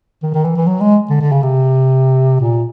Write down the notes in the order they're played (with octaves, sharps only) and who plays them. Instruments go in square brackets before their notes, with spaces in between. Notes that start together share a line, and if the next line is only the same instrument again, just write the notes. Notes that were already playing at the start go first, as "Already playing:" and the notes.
[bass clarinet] D#3
D#3
E3
E3
F#3
G#3
D3
D3
C#3
C3
A#2